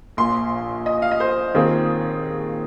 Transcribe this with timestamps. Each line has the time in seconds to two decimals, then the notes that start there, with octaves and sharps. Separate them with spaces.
0.17 A#1 A#2 F3 C6
0.86 D#5
1.02 F5
1.11 D#5
1.20 C5
1.54 D#2 D#3 C4 F4 G#4